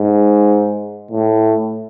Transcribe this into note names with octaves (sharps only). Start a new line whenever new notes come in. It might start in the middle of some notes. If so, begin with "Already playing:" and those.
Already playing: G#2
A2